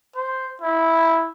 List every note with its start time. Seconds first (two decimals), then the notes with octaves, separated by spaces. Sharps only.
0.16 C5
0.61 E4